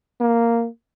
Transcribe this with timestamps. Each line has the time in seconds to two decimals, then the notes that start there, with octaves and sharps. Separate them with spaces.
0.21 A#3